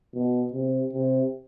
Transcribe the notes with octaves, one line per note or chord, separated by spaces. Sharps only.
B2
C3
C3